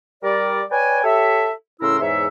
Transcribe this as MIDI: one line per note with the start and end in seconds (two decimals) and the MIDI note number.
0.23 0.62 55
0.23 0.62 70
0.23 0.62 74
0.70 1.03 71
0.70 1.03 73
0.70 1.03 74
0.70 1.03 79
0.70 1.03 80
1.04 1.50 67
1.04 1.50 69
1.04 1.50 73
1.04 1.50 76
1.81 1.97 45
1.81 1.97 49
1.81 1.97 64
1.81 1.97 70
1.81 1.97 84
1.81 1.97 88
2.00 2.28 40
2.00 2.28 44
2.00 2.28 73
2.00 2.28 76